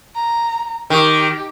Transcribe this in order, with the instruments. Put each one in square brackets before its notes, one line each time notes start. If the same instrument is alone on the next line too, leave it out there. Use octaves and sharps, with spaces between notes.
[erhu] A#5
[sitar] D#3 [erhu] G4